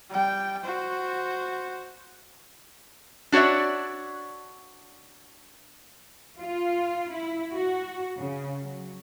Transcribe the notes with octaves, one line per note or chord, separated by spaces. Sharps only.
G3 G5
F#4 C5
D4 F#4 C#5 D5 E5
F4
E4
F#4
C#3
F#3